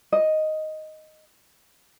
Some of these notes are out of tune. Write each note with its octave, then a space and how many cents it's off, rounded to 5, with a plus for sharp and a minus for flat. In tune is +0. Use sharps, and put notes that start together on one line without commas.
D#5 +0